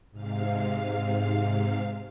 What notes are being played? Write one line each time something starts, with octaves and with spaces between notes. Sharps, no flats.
G#2 C3 F5